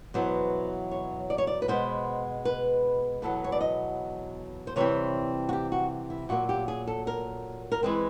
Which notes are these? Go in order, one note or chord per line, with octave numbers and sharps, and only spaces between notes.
E2 B2 F#3 B3 C5
C#5
D5
C#5
D5
B4
B2 G#3 B3 C5
B4
E2 B2 F#3 B3 A4
C#5
D5
D#5
C5
C3 E3 G3 C4 C#5
F#4
G4
F#4
E4
A#2 F#3 A#3 F#4
G4
G#4
A4
A#4
A#4
E3 G#3 C4 B4